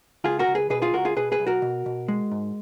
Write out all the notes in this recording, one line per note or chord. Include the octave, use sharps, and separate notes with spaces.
C#2 F4 G#4
F#4 A#4
C#2
G#4 B4
B2 G#4 B4
F4 G#4
C#2 F#4 A#4
F4 G#4
B2 G#4 B4
G#4 B4
B1
F#4 A#4
B2
B2
G#3
G#2